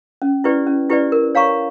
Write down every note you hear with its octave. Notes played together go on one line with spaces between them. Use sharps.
C#4
E4 G4 B4 D5
C#4
E4 G4 B4 D5
A#4
C#5 F5 A#5 C#6